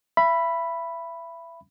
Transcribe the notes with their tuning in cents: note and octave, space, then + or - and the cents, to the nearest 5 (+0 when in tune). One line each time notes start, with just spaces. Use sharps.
E5 +30 B5 +0